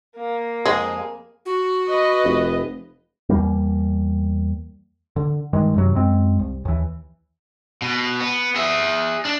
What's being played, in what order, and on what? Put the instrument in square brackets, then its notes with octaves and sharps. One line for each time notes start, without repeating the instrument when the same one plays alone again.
[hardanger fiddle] A#3
[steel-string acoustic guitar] F2 G#4 [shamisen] G#3
[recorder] F#4
[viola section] B4 D#5
[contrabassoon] F1
[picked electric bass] E2 G3 A#3
D3
G2 D#3 G#3
F#2 C3 F#3
F#2 G#3 C4
C2
D#2 E3
[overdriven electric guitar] B2
B3
G#4 E5
D4